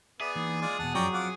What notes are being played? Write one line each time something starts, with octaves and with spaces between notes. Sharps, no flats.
B3 G#4 D5 E5
E3 A#3 D#4
G#3 F4 D5
E2 B2 F#5 A5
F#2 F3 F#3 C#4 D5 G5 A#5 C#6
F3 C4 F4 F#5 D6